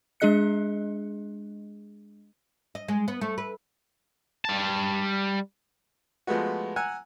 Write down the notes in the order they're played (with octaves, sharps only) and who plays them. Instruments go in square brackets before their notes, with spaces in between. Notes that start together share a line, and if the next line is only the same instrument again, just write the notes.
[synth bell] G#3 D4 G#4 D#5 F#6 C#7
[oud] D#5
G#3
B3
A3
B4
[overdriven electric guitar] G3 A5
[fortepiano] F3 G#3 A3 B3 F#4
F#5 G#5 A#5 E6 F#6